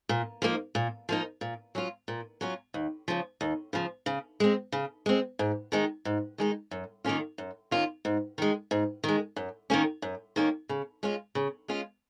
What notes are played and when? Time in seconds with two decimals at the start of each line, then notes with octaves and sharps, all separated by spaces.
0.09 A#2
0.42 F3 A#3 D#4
0.75 A#2
1.09 F3 A#3 D#4
1.41 A#2
1.75 F#3 C#4 F4
2.08 A#2
2.41 F#3 C#4 F4
2.74 D#2
3.08 C#3 F3
3.41 D#2
3.73 C#3 F3
4.06 C#3
4.40 G#3 C4
4.72 C#3
5.06 G#3 C4
5.39 G#2
5.72 D#3 G#3 D#4
6.05 G#2
6.38 D#3 G#3 D#4
6.71 F#2
7.04 D#3 A#3 C#4 F4
7.38 F#2
7.71 D#3 A#3 C#4 F4
8.05 G#2
8.38 D#3 G#3
8.71 G#2
9.04 D#3 G#3
9.36 F#2
9.70 D#3 A#3 C#4
10.02 F#2
10.36 D#3 A#3 C#4
10.69 C#3
11.03 G#3 C#4 F4
11.35 C#3
11.68 G#3 C#4 F4